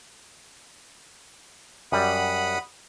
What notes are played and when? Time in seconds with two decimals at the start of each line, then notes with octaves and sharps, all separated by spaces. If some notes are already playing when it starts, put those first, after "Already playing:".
1.92 F#2 G3 F#5 B5 D#6